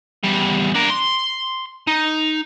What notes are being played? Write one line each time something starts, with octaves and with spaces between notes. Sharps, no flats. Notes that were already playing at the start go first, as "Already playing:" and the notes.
E2 G3
D4 A#4
C6
D#4